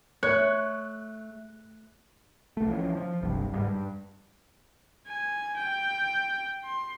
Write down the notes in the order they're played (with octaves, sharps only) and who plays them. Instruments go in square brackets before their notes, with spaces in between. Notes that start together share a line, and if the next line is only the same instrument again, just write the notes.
[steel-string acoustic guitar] A3 [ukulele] C#5 [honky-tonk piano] F#6
[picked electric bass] B1 A3
E3 F3 B3 C#4
F3
F#1 C2 G2
G#2 C#3 G3
G2
[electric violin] G#5
G5
C6